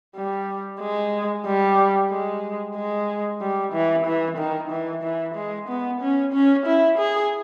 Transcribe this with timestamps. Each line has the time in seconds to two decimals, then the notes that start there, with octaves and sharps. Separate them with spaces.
0.16 G3
0.80 G#3
1.46 G3
2.10 G#3
2.75 G#3
3.41 G3
3.73 E3
4.05 E3
4.38 D#3
4.71 E3
5.03 E3
5.35 G#3
5.68 B3
6.01 C#4
6.33 C#4
6.66 E4
6.98 G#4